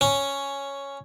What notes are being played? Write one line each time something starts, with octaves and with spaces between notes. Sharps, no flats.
C#4